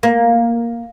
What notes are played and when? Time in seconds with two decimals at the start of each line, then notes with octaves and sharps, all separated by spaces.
0.03 A#3